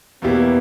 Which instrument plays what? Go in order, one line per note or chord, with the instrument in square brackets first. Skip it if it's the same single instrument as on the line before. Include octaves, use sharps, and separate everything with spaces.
[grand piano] E2 B2 A#3 E4 G4 [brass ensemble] B3